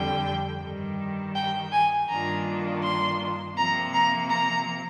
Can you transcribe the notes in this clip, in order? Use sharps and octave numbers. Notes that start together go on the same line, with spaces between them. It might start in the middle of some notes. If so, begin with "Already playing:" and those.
Already playing: F2 D3 G3 G5
G2 D#3 G3
G5
G#5
G2 D#3 A#3 D4 F4 A#5
C6
C3 F3 A#3 A#5
A#5
A#5